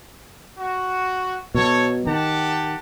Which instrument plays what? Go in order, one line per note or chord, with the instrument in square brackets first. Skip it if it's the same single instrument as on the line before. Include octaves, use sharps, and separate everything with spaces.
[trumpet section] F#4
[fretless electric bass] B2 F#3 [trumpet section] A4 C#5
[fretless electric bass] D#3 [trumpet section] G4 F#5 A5